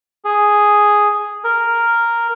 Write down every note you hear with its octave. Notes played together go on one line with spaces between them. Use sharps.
G#4
A#4